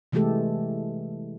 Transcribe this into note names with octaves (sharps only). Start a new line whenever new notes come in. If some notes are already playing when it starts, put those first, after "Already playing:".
C3 E3 G#3 A3 G4 A4